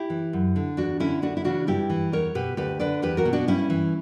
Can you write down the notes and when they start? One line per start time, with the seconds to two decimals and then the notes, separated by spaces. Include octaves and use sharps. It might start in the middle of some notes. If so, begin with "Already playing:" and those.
Already playing: E4 G4
0.10 E3
0.33 F#2
0.56 D3
0.77 E2 D4 F#4
1.00 D3 C#4 E4
1.22 D2 D4 F#4
1.37 E4
1.44 C#3 E3 D4 F#4
1.67 G2 E4 G4
1.90 E3
2.12 E2 A#4 C#5
2.35 B2 G4 B4
2.57 D2 G4 B4
2.79 D3 B4 D5
3.02 E2 G4 B4
3.17 F#4 A#4
3.25 B2
3.33 D4 F#4
3.48 G2 C#4 E4
3.70 E3